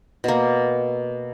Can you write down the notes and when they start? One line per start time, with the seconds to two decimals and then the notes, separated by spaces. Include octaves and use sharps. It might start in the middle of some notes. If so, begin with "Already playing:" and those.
0.24 B2 A#3